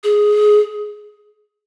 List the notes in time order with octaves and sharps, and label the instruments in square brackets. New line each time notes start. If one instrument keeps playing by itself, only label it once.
[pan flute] G#4